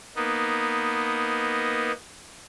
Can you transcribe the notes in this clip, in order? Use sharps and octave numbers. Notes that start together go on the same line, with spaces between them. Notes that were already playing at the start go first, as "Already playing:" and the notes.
A#3 B3 D#4